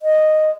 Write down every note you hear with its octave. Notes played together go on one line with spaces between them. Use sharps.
D#5